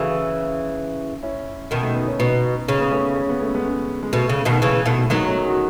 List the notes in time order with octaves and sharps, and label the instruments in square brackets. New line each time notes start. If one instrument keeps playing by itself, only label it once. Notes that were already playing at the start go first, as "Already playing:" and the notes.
Already playing: [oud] C#3 E3 [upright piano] F#4 G#4 A4
[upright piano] C#4 E4
[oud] B2 D#3
[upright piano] A3
B3
C#4
[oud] B2 [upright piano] B3 D#4
[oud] C#3 [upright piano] C#4
[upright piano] B3
A3 C#4
C#4
B3
A3
G#3 B3
G#3
[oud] B2 [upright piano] A3
[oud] C#3
B2 D#3
[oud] C#3 E3 [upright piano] G#3
[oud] B2 D#3 [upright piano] A3
[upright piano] A3
[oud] D#3 F#3 [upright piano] G#3 B3
[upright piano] A3 C#4
G#4
F#4